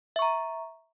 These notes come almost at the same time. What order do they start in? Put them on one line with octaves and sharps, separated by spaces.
E5 C#6 A#5